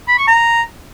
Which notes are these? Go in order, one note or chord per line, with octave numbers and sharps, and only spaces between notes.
B5
C#6
A#5